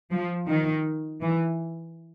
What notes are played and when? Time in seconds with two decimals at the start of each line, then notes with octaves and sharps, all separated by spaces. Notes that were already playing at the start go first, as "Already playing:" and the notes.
0.11 F3
0.48 D#3
1.22 E3